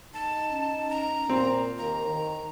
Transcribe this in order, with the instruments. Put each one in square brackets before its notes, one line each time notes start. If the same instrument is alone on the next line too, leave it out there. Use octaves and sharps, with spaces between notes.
[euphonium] D#4 [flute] A5
[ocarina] C#4
[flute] A#5
[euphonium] A#2 [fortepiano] C4 [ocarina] A#4
[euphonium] D#2 [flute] A#5
[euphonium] D#3